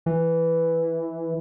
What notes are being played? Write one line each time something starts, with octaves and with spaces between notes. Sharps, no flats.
E3